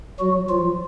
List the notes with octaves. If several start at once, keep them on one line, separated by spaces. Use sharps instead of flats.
F#3 F#4
F3 F4